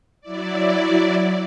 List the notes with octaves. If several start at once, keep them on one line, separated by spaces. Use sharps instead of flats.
F#3 E4 D5